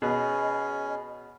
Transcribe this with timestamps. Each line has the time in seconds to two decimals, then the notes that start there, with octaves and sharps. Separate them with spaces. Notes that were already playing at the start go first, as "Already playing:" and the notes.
0.02 B2 C#4 G#4 B4 D#5